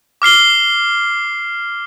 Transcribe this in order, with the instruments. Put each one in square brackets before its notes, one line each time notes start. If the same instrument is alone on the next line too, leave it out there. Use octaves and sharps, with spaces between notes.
[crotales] D6 F6 C7 G7